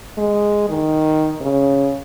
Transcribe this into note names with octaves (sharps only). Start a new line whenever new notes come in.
G#3
D#3
C#3